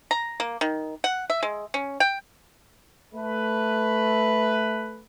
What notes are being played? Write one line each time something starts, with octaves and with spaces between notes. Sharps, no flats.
A#5
A#3
D#3
F#5
E5
G#3
C#4
G5
A3 B4